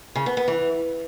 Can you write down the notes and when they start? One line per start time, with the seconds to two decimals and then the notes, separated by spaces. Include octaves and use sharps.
0.16 C#3
0.26 B3
0.37 B3
0.48 E3